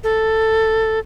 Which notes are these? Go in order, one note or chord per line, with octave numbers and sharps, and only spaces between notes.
A4